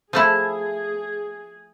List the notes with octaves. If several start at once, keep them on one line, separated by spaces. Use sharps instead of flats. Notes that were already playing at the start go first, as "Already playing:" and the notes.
F3 A3 E4 G#4